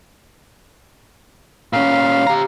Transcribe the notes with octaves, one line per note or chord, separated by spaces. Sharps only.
A#2 C#4 F5
G4 A#5